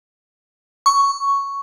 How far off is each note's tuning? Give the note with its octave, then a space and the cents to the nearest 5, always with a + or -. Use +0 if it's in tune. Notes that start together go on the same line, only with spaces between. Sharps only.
C#6 +5